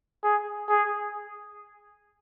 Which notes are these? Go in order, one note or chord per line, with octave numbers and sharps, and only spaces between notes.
G#4
G#4